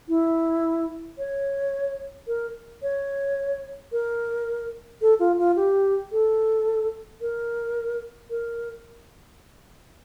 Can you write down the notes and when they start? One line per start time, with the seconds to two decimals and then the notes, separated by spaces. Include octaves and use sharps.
0.09 E4
1.18 C#5
2.27 A#4
2.82 C#5
3.92 A#4
5.02 A4
5.20 F4
5.39 F4
5.56 G4
6.12 A4
7.21 A#4
8.30 A#4